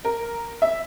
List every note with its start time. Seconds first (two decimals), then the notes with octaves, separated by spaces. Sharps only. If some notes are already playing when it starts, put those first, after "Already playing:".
0.05 A#4
0.62 E5